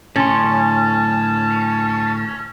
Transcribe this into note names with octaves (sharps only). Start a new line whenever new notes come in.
A2 D3 C#4 A5 C6